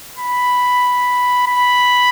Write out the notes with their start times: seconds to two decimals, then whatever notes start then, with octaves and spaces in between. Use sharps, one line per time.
0.17 B5
1.47 B5